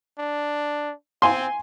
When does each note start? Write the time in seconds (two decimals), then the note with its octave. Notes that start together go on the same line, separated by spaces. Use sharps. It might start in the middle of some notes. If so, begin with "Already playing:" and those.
0.18 D4
1.22 C4 G#5 C6